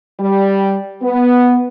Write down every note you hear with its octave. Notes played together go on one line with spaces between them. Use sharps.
G3
B3